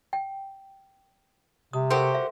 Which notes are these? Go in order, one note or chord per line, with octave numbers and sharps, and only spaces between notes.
G5
C3 D#6
F#4 G4 A4 A#4 C5
E5